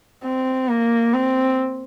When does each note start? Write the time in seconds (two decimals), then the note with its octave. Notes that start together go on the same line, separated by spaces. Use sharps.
0.24 C4
0.69 A#3
1.14 C4